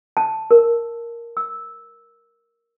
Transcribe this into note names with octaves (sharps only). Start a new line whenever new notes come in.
A5
A#4
E6